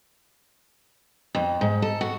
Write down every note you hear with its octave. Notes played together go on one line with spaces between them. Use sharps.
F2
G#2
A4
F#4